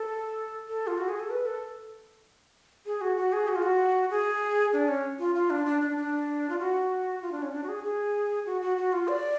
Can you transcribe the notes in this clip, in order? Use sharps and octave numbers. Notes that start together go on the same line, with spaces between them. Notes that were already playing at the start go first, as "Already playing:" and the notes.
Already playing: A4
A4
F4
F#4
G#4
A4
B4
A4
G#4
F#4
F#4
G#4
F#4
F4
F#4
G#4
D4
C#4
F4
F4
D4
D4
D4
D4
F4
F#4
F4
D4
C#4
D4
F#4
G#4
G#4
F#4
F#4
F#4
F4
D5